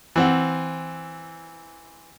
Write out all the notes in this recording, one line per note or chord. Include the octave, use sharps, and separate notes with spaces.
E3 C4 F#5